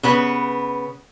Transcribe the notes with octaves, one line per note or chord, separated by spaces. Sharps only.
C#3 B3 B4